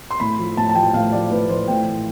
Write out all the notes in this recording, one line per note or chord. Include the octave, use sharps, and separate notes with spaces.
C6
A2 B5
F3
A2 A5
A5
F3 G5
A2 F5
F3 D5
A2 B4
F3 C5
A2 G5
E3